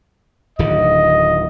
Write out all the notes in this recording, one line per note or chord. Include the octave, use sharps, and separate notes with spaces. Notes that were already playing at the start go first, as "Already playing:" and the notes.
D1 D3 D#3 D#5